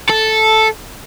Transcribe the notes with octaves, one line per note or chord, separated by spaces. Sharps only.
A4